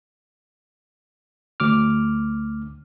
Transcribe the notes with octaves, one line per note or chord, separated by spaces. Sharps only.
D2 D6 F6